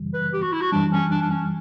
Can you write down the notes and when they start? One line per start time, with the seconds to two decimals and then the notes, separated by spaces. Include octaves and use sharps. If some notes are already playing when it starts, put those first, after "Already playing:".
Already playing: F#2 C#3 E3 G3
0.14 B4
0.33 G4
0.42 F#4
0.52 E4
0.61 F#4
0.72 F#2 E3 G3 D4
0.92 C#4
1.11 D4
1.21 D4
1.30 C#4